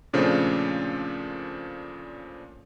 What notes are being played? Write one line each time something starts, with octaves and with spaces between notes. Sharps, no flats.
A#2 C#3 F3 A3 C4 D4